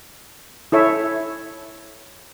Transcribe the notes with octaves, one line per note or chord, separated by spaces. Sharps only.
E4 A4 C#5 E5